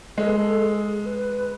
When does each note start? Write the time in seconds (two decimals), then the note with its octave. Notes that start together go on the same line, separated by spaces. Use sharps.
0.18 G#3 A4
0.27 B4
0.36 A4
0.62 G#4
1.06 B4